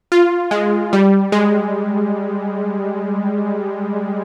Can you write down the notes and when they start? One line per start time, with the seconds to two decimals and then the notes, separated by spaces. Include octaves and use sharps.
0.12 F4
0.51 G#3
0.93 G3
1.32 G#3